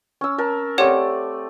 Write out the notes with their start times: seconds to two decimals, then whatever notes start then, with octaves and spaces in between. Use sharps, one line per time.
0.21 C#4 E6
0.38 A#4 A5
0.78 A3 C4 G4 C#5 D5 F#5